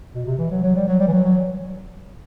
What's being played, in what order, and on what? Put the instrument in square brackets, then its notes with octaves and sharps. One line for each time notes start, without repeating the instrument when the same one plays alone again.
[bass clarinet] B2
C3
E3
F#3
F#3
G3
F#3
G3
E3
F#3
F#3